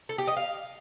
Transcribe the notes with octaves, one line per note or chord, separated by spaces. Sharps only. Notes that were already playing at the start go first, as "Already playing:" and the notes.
A4
G4
D#5
F5